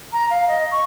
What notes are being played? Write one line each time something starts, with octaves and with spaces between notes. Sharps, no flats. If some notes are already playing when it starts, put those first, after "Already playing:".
A#5
F5
D#5
C#6